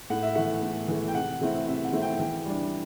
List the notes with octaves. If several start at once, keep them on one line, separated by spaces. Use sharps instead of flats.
A2 F#5
E5
E3 A3 F#5
A2
E3 A3
G5
C3 F#5
E3 A3 C4 E4
C3 E5
F#5
E3 A3 C4 E4
G5
E3 G5
G3 D4